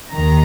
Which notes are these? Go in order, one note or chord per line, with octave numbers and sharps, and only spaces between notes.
D#2 D#3 A#5